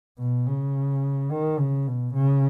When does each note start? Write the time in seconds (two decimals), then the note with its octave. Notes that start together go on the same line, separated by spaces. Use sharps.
0.19 B2
0.46 C#3
1.31 D#3
1.59 C#3
1.87 B2
2.14 C#3